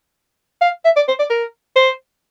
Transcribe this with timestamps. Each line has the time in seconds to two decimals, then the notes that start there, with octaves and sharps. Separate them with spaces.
0.61 F5
0.85 E5
0.96 D5
1.08 C5
1.19 D5
1.30 A#4
1.76 C5